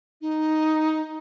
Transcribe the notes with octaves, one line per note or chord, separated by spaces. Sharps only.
D#4